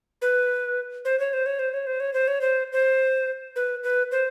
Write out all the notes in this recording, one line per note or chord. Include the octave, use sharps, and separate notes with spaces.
B4
C5
C#5
C5
C#5
C5
C#5
C5
C#5
C5
C#5
C5
C5
B4
B4
C5